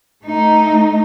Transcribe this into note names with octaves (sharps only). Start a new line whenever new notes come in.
A3 D#4